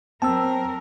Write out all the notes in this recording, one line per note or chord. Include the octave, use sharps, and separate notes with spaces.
F#3 C4 A#4 A5 E6